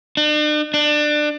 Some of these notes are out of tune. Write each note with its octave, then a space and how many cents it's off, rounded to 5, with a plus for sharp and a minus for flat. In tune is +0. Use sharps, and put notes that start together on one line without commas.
D4 +45
D4 +25